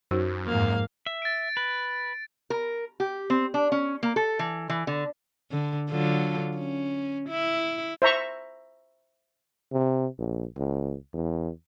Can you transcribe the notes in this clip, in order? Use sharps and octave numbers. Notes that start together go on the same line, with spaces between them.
F#2 D#4 F#4 C5
F2 G#2 A#3 F5
E5
A6 D7
B4
A#4
G4
C4
D4
C#4
A#3
A4
E3
E3
D3
D3
D3 F#3 F4
C#4
E4
C5 E5 A#5 C#6
C3
A#1
C#2
E2